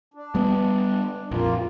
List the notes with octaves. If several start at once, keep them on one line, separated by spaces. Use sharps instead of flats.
D4
G3 B3
A#1 F2 A#3 F4